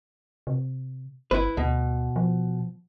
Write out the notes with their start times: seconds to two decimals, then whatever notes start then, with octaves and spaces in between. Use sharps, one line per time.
0.47 C3
1.31 G1 E4 B4
1.57 D2 B2
2.16 F3